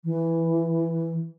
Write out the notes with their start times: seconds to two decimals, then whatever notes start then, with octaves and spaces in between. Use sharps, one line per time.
0.04 E3